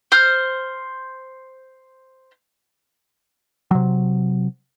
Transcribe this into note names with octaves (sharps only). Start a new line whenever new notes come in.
C5 F6
C3 F#3